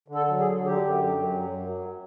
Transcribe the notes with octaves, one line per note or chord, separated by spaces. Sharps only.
D3
A4
F#3
G#4
D3
D3 G4
F#2
F#3
F#2
F#3